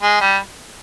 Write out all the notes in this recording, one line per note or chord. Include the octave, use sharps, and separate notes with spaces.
G#3
G3